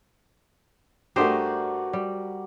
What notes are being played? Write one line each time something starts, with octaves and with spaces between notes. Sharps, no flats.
G2 A3 F#4 G4 A#4 C5 D5 D#5
G3